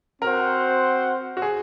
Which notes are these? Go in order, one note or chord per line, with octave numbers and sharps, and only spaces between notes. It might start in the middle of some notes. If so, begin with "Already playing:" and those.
C4 F#4 A#4 C5 F#5
F#4
G#4